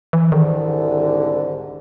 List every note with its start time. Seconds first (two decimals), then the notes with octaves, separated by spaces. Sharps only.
0.13 E3
0.32 C2 G#2 D3 D#3